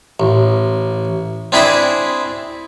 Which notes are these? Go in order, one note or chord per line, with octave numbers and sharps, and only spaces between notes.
A1
C4 D4 E4 G#4 C5 B5